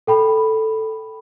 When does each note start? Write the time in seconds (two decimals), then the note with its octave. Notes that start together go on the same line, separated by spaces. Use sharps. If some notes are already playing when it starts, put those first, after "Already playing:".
0.07 A4 G5 B5